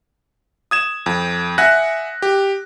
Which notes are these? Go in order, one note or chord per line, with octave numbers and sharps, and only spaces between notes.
D#6 G#6 E7
F2
E5 F#5 G#5 F#6 A#6
G4